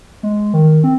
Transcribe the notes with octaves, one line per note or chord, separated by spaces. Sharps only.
G#3
D#3
C4